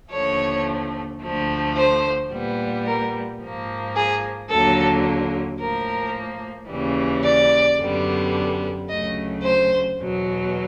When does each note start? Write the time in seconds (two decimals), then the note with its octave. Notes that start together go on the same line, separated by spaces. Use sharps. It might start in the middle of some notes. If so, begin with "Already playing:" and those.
0.12 D#2 D3 F3 A3 C#5
1.22 D2 D3 F3 A3
1.77 C5
2.32 A#2 G3 B3
2.87 A#4
3.42 G#2 F3 A#3
3.96 G#4
4.51 D#2 D3 F#3 A#3 A4
5.60 A2 F3 A#3 A#4
6.70 D#2 C#3 E3 G3
7.25 D5
7.80 F#2 D3 G3 B3
8.89 D2 C#3 F#3 A3 D#5
9.44 C5
9.99 E2 B2 F#3